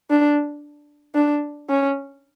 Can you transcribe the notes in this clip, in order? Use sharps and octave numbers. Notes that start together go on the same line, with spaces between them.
D4
D4
C#4